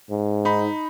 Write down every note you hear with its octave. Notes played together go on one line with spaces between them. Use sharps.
G#2
D#4 B5